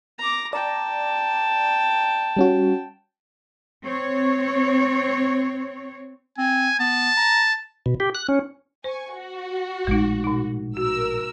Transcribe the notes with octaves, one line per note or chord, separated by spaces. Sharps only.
A#5 D6
D5 G5 A5 A#5
G3 C#4 F#4
C4 C#5
C4 G#5
B3 A5
A#5
B2
G4
F#6
C#4
C5 G#5 C#6
F#4
A#1 A2 G#3 D#4
B2 D#4
F#4 A#4 E6